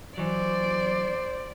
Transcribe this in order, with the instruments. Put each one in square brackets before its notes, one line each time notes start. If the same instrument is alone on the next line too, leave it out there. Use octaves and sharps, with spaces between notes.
[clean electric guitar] E3 F#3 [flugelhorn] C5 [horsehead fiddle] D5